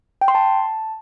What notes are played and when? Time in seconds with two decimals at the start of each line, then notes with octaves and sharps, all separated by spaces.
0.21 G5
0.28 C6
0.35 A5